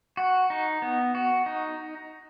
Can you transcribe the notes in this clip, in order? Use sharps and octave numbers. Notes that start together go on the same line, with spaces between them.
F#4
D#4
B3
F#4
D#4